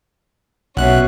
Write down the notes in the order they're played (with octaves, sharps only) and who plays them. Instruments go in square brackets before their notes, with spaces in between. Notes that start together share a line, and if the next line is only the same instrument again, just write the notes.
[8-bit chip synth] B1 F#6 [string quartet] B2 C#4 [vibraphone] C#5 E5 F#5